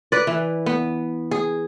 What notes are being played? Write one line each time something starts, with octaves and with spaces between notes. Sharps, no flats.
B4 D5
E3
B3
G#4